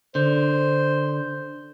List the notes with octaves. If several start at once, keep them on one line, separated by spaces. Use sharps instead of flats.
D3 C5